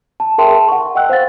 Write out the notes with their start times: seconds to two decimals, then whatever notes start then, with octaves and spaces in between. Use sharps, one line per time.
0.20 A5
0.38 G#4 A#4 E5 G5 A5 C6
0.54 A5
0.68 F#5 C#6
0.95 D#5 F#5 G5 E6 F#6
1.09 C5 F5 F#5 A6